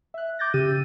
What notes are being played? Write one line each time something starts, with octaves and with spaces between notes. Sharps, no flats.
E5 F#6
D6 G6 A6 A#6
C#3 G4 E6 A6 D#7